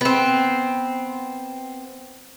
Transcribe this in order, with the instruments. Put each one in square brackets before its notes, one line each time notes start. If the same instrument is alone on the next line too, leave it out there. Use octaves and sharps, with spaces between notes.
[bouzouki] B3 C4